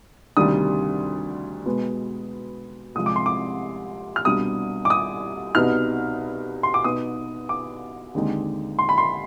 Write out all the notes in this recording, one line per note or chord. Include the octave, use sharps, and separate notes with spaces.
D2 C3 D#3 G3 D4 D#6
B2 G#3 B3
C2 C3 F3 G#3 D#6
D6
C6
D6
F6
C2 B2 G3 D4 D#6
D6
D#6
C2 B2 B3 D#4 F6
C6
D6
B2 B3 D#4 D#6
D6
D#2 D3 G#3 C4 D#4
C6
B5
C6